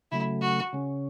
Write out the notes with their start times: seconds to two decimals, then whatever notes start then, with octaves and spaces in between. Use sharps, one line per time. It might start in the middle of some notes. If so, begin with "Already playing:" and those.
0.12 C#3 F#3 A3 E4
0.42 F#4
0.73 C#3 G#3 C#4